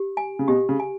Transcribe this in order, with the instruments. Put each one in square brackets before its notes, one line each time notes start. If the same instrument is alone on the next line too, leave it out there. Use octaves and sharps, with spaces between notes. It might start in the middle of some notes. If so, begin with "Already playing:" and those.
Already playing: [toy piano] G4
G#5
[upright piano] C#3
[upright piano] B2 [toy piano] G4
[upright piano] C#3
[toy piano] G#5